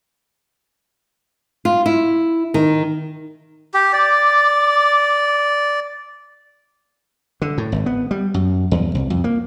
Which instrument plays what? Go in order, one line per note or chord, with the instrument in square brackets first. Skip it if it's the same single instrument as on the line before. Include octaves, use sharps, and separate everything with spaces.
[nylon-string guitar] F4
E4
D#3
[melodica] G4
[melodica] D5 [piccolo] D6
[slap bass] D3
A2
G#1
B3
G3
F#2
E2
C2
F2
A#3